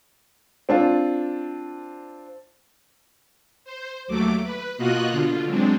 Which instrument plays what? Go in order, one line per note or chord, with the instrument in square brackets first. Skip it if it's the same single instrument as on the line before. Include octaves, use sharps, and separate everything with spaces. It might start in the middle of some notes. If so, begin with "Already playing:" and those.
[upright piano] C4 D4 F4
[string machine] C5
D#2 F#3 A3 D6
B4
B2 A#3 F4 F#4 D#5 F#6
B2 D3 F4
F#3 G#3 C4 D4